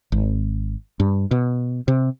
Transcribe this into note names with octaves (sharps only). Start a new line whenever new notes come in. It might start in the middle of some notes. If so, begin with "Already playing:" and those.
G#1
G2
B2
C3